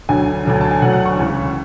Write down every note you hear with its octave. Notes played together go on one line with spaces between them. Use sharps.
D2 D3 F#3 G#5
D2 D3 F#3
A5
G#5
D2 D3 F#3 F#5
F#5
C#6
C#2 C#3 E3